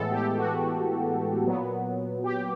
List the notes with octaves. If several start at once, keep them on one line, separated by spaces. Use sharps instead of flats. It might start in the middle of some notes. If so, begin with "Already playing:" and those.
Already playing: A2 E3 G#3 B3 A4
G4
F#4
A#2 F#3 B3
G4